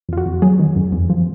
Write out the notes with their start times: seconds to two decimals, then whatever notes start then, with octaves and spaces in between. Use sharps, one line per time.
0.09 F2 F4
0.17 F#4
0.26 F2
0.42 F#3 G#4
0.59 D#3
0.76 F#2
0.92 F2
1.10 F3